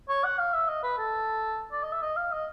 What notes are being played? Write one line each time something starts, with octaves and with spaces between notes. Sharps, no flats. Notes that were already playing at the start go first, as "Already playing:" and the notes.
C#5
F#5
F5
E5
D#5
B4
A4
D5
D#5
E5
D#5
F5
D#5